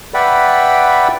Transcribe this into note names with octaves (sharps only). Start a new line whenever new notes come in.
B4 D5 E5 F#5 G5 B5